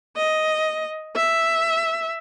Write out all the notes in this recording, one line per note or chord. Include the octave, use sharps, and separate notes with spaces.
D#5
E5